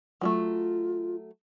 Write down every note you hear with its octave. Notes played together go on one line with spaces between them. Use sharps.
F#3 G3 A3 F4